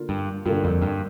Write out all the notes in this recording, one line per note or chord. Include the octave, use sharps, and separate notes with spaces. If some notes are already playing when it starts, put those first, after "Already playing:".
Already playing: D3 A#3 F4
G2
G2 D3 A#3 F4
F2
G2